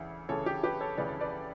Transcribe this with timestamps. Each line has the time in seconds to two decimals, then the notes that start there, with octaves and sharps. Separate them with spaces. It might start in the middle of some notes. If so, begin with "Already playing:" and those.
Already playing: D2 C#3 E3
0.29 D2 C#3 E3 A4 C#5
0.46 G4
0.64 G4 B4
0.81 A4 C#5
0.98 D2 C#3 E3 B4 D5
1.21 B4 D5